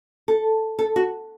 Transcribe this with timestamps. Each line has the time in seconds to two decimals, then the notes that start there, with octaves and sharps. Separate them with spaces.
0.28 A4
0.79 A4
0.96 F#4